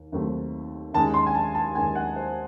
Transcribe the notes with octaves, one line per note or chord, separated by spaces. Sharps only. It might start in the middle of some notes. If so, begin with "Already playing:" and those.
Already playing: D#2
D#2 D#3 F#3 A3 C4
D#2 D#3 G#3 C#4 A5
C6
G#5
A5
A5
D#2 D#3 G#3 C#4 G#5
F#5
C5